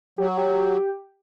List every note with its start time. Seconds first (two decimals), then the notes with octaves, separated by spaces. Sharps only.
0.18 F#3 G4
0.28 F#4
0.37 G4